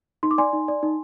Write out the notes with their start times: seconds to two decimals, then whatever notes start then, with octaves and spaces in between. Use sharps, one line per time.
0.23 D#4 C6
0.31 D6
0.38 D5 G#5 C6
0.53 D#4
0.68 D5
0.83 D#4